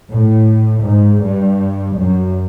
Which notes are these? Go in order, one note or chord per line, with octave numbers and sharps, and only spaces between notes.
A2
G#2
G2
F#2